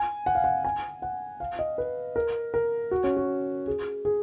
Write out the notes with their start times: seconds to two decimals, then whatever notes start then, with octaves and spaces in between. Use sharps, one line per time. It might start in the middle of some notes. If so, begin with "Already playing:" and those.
Already playing: G#5
0.26 F#5
0.35 F5
0.44 F#5
0.65 G#5
1.02 F#5
1.40 F5
1.59 D#5
1.78 B4
2.16 A#4
2.54 A#4
2.91 F#4
3.04 C#4
3.17 F#4
3.67 G#4
4.05 G#4